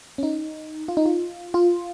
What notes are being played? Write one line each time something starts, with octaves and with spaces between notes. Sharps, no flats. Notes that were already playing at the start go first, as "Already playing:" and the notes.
C#4
D#4
F4
D#4
F4
F4